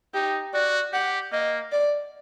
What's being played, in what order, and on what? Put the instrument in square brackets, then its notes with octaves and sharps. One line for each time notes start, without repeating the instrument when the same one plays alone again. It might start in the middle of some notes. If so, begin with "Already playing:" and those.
[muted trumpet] D#4 [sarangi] G4
[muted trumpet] F#4 [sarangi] D5
[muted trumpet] G4 [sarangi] F#5
[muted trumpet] A#3 [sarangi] D#5
[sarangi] D5